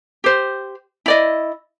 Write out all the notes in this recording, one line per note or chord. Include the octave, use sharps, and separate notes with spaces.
G4 C5
E4 D5 D#5